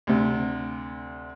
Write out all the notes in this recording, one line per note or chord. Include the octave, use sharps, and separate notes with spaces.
D2 C3